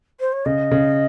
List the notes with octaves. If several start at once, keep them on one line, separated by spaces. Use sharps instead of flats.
C5
C#5
C#3 D#5
C#3